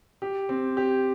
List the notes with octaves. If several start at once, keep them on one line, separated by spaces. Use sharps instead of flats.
G4
C4
G4